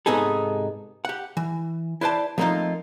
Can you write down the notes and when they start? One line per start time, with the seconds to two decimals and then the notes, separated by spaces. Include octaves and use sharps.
0.06 G#2 C3 B3 D#4 G#4 A4
1.05 G4 F#5
1.37 E3
2.01 E4 B4 C5 D5 A5
2.38 F3 A3 A#3 C4 D#4 F4